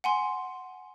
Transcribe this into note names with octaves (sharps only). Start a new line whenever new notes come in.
F#5 G#5 C6